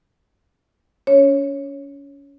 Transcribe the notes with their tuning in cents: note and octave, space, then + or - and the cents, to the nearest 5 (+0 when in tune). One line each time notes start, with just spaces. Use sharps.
C#4 +30 C#5 -5